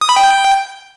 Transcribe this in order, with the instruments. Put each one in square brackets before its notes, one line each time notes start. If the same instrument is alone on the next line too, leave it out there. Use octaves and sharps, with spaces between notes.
[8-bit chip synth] D#6
B5
G5